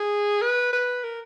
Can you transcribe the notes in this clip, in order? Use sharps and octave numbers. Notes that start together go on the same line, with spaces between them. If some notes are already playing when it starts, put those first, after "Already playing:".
Already playing: G#4
B4
B4
A#4